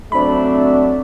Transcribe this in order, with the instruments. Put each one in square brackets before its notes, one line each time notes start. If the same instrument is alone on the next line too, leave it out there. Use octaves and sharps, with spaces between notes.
[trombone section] F#3 A3 D4 [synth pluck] C4 B5